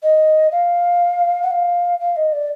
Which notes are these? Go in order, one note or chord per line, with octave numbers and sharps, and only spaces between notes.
D#5
F5
F#5
F5
F5
D#5
D5